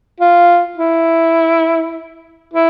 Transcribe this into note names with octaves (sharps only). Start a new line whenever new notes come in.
F4
E4
E4